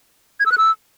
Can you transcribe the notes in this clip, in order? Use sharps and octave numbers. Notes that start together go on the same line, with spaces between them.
G#6
E6
F#6
E6